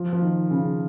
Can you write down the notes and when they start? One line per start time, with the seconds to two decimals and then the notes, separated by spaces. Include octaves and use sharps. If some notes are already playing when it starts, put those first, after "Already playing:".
Already playing: F3
0.13 F3
0.22 D#3
0.51 C#3